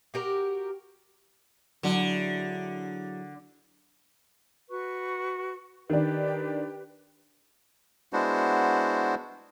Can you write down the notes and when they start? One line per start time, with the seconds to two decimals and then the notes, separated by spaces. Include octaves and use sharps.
0.14 F#4 G4 A#4
1.83 D3 F#3 E4 G#4
4.70 F#4 B4 C#6
5.90 D#3 D4 G4 B4
8.13 G#3 B3 D4 E4 F#4 C5